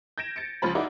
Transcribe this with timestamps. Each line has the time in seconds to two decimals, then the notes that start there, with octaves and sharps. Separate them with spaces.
0.18 G6 G#6 A#6 D7 E7
0.36 A6 C#7 D7
0.62 C#2 F3 F4 C5 B5
0.75 D#4 E4 F#4 A#4 D5 F5